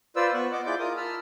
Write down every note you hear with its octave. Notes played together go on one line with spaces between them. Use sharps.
F4 B4 C5 D5 E6
B3 C#6 F#6
D#5 F#5 D6
E4 F4 G#4 D5 D6 G6
F4 A#4 D#6
A5 B5 E6 F6